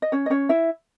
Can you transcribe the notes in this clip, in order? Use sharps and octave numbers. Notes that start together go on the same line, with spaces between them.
D#5
C#4 C#5
D#5
C#4 C#5
E4 E5